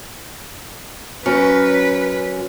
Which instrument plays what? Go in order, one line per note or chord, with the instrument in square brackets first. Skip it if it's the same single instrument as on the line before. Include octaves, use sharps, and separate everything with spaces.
[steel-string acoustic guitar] F#2 C#4 A#4 [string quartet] B4